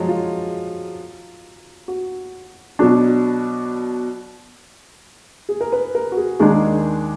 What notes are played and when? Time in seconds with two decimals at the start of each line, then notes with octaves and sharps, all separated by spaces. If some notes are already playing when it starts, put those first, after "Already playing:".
Already playing: F3 F#3 G#3
0.08 F4
1.88 F#4
2.79 B2 F#3 D4
5.49 G#4
5.61 A#4
5.72 B4
5.95 A#4
6.12 F#4
6.17 G#4
6.39 D#2 D#3 G#3 D4 G#4